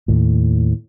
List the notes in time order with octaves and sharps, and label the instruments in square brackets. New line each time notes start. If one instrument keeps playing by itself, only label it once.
[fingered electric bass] D#2 A2